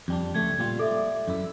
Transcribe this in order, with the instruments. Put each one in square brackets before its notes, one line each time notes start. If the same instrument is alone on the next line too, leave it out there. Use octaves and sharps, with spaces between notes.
[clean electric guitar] F2 G3 D4
[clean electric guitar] C#2 A3 [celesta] G#6
[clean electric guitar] A#2 G3 F4
[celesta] A4 E5 [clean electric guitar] D5
[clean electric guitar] F#2 E4